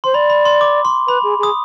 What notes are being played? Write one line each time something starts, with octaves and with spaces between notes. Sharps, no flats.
C5 C6
D5 B5
B5
C6
D6
C6
B4 B5
G#4
G#4 D#6